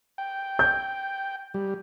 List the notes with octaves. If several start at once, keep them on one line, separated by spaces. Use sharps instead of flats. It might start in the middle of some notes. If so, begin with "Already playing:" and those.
G5
G6
G3